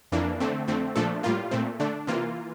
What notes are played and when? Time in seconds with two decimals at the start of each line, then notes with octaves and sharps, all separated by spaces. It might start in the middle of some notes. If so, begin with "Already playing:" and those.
0.12 F2 E3 A#3 D4
0.40 D3 A3 C4
0.68 F2 D3 A3 C4
0.96 A#2 F3 A3 D4 A4
1.23 A2 G3 A#3 F4
1.51 A#2 A3 C4
1.80 D3 A3 D4
2.07 C3 E3 A#3 F4